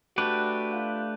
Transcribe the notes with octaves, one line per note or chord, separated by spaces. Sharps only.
A3 D4 F#4 G4 B4
F4